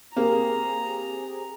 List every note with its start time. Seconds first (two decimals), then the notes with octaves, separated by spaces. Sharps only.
0.16 A#3 C4 G4 G#4 A#5